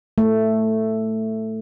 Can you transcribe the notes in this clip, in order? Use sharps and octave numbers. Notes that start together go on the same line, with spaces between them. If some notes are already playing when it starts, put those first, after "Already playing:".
A3